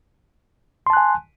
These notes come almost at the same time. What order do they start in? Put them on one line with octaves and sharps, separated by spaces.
C6 A5 F#6 G#5